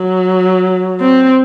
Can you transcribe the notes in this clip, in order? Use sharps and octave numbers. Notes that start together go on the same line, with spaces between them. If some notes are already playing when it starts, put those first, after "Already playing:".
Already playing: F#3
C4